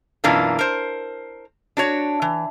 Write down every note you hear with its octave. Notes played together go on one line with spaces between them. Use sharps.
F#2 B2 E3 A#3 D4 F4
A#4 C5
D4 F#4 C#5
E3